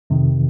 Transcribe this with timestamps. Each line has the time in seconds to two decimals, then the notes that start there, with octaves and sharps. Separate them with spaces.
0.10 F2 C3 D#3